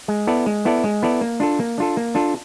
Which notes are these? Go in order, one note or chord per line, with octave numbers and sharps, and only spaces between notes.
G#3
B3 E4 A4 D5
G#3
B3 E4 A4 D5
G#3
B3 E4 A4 D5
A#3
D4 F4 A4
A#3
D4 F4 A4
A#3
D4 F4 A4